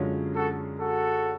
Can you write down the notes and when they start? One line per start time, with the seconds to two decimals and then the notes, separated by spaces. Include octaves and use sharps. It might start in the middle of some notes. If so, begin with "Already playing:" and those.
Already playing: F#2 D3 G#3 C#4 F4
0.34 F#4 A4
0.79 F#4 A4